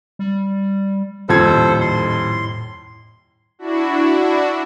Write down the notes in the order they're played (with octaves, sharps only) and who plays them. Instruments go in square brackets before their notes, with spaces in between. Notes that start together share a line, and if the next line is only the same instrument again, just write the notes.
[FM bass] G3
[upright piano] D#1 F2 G#6 [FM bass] A2 [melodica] A4 C5
[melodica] C6
[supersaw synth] D4 E4 F#4